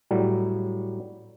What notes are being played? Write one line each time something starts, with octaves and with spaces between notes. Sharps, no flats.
A2 F#3 G3